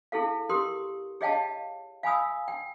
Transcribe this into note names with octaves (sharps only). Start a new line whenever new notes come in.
E4 G#4 A4 F5
G4 A#4 C6 D#6
G#4 C#5 D#5 F5 G5 A5
F5 G#5 B5 D#6 E6
G5